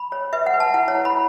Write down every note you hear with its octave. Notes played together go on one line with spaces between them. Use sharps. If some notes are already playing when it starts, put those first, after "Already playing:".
Already playing: B5
C#5
B4 E5
F#5
B4
A5
E4 F#5
C#5
E4
B5